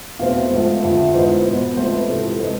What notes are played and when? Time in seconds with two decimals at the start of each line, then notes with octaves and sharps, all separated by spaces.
0.19 E2 B2 A3 C4 F5
0.51 G#2 F3 A3 C4
0.82 F2 D3 F3 E5
1.14 G#2 E3 G#3 B3 C5
1.45 B2 B3
1.77 G#2 F3 A3 C4 C5
1.92 B4
2.08 C3 E3 G#3 A4
2.22 B4
2.35 C3 G#3 C4 A4